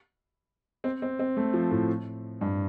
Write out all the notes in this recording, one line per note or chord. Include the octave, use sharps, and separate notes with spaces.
C4
C4
C4
A3
F3
A2
G2